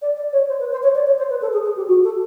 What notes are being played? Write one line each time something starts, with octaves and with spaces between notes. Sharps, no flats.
D5
D5
C#5
C5
B4
C5
C#5
D5
C#5
C5
B4
A4
G#4
G#4
G4
F#4
A4